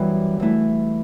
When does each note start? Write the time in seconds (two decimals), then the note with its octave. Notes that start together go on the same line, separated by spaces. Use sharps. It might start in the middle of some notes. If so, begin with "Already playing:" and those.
Already playing: F#2 E3 G3 B3
0.40 E3 A3 E4